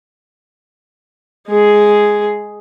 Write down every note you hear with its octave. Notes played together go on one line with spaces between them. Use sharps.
G#3 G#4